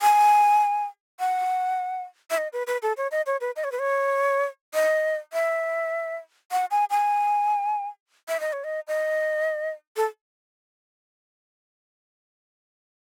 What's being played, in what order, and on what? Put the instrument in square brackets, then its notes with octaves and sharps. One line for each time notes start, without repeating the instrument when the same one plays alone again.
[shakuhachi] G#5
F#5
E5
D#5
B4
B4
A4
C#5
D#5
C#5
B4
D#5
C#5
B4
C#5
D#5
E5
F#5
G#5
G#5
E5
D#5
C#5
D#5
D#5
A4